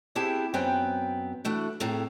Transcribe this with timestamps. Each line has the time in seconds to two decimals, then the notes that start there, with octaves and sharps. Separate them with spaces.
0.15 B3 C4 E4 G4 G#4 A5
0.54 F#2 B3 C4 B4 G5 G#5
1.45 E3 A3 D4 F#4
1.80 A2 B3 C4 G#4 A4 A#5